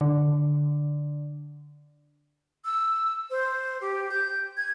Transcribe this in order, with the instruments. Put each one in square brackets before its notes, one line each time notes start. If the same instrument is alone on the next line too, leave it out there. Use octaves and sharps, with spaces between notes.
[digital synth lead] D3
[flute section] E6
C5
G4
G6
G#6